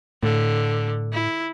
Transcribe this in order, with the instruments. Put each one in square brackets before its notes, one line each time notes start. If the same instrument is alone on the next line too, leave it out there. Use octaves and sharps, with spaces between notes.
[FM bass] A2 [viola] D3
[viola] E4